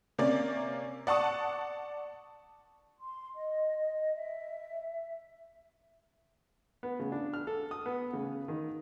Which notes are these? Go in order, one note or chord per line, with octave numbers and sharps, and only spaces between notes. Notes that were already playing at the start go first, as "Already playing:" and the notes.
C3 A#3 C#4 D5
D5 F#5 A5 C#6 D#6
C6
D#5
E5
B3
C#3
D4
F6
A4
D#6
B3
C#3
D#3